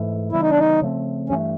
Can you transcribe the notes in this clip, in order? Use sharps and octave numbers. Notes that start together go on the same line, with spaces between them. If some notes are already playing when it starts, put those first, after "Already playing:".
Already playing: G#2 E3 A3
C#3 E3 G3 B3 E4
D#4
D4
D#4
C#3 F3 A3 C4
G2 E3 A3 C#4